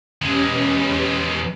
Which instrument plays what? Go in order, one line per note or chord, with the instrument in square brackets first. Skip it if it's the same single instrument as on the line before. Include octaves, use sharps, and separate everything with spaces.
[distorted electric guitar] E2 G#3 [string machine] C#4 G4 B4